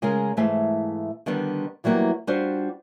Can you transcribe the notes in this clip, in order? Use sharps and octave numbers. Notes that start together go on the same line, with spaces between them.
C#3 G#3 G#4 A#4
G#2 E3 A3 G#4 E5 F5
D3 D#3 G3 B3 D4
E3 F#3 G3 A#3 B3
G3 D4 F4 F#4 C5 D5